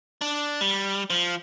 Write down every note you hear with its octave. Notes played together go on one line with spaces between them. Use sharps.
D4
G3
F3